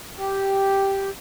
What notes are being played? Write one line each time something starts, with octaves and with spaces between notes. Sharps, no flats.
G4